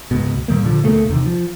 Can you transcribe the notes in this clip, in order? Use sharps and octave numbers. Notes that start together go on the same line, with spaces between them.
C#2 G#2 B2
A#2 D#3 G3 A#3
A#2 D3 F3
D2 B2 A3 A#3
E2 C3 D#3
F3